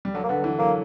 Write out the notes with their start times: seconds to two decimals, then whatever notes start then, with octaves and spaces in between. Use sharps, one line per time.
0.05 G3
0.14 D3 F#3
0.24 A#3
0.29 D3 B3
0.44 E3
0.59 F#3 A#3